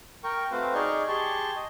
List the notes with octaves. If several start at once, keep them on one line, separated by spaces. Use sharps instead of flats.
A#4 G5 C#6
A3 C4 F#4 B4 C5 F5
D#4 G#4 D5 C#6 F6 G6
G4 G#4 A5 C6 C#6
D#5